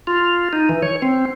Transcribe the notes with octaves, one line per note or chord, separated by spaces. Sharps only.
F4
D#4
E3
C#5
C4